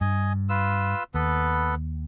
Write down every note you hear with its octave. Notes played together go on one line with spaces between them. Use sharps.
G2 D#5 G#5
F4 B4 E6
D#2 B3 A4 B4